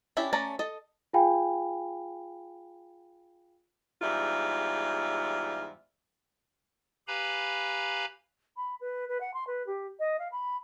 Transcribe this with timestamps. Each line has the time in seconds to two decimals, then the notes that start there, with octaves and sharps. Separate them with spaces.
0.17 C#4 D4 E4 G4 E5
0.33 A3 C#4 D5 A5 A#5
0.59 A4 D#5
1.13 F4 G#4 F5 G5 G#5 B5
4.02 E2 G#2 G3 F4 E5
7.08 G4 B4 F5 G#5 A#5 B5
8.56 B5
8.81 B4
9.08 B4
9.20 F#5
9.33 C6
9.47 B4
9.66 G4
9.99 D#5
10.19 F5
10.32 B5